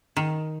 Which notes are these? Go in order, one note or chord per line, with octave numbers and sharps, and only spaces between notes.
D#3